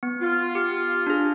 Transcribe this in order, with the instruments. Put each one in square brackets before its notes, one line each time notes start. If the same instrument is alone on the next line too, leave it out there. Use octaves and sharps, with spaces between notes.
[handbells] B3
[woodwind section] F4
[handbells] G4
D4 G#4